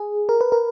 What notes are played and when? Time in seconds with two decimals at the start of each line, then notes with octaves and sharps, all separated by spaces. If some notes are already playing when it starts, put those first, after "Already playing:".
Already playing: G#4
0.29 A#4
0.41 B4
0.52 A#4